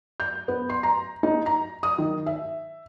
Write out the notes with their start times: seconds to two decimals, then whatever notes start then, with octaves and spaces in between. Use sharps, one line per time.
0.20 G6
0.48 B3
0.70 C6
0.83 A#5
1.23 D#4
1.46 A#5
1.83 D#6
1.98 D#3
2.26 E5